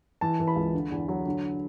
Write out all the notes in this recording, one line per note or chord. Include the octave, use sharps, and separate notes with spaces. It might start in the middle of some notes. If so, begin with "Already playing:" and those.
E3 A5
E3
B5
C#2
D3
E2
F#3
D3